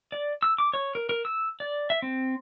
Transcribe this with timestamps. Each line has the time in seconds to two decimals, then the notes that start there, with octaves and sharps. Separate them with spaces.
0.12 D5
0.43 E6
0.58 D6
0.74 C#5
0.95 A#4
1.09 A#4
1.25 E6
1.60 D5
1.90 E5
2.02 C4